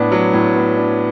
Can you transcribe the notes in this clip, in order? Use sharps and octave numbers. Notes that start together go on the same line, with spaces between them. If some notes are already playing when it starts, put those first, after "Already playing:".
Already playing: A2 B3 D4
F#3
A2
B3
D4